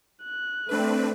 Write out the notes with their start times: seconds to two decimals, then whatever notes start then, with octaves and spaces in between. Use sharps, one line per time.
0.24 F#6
0.69 A3 C4 D4 B4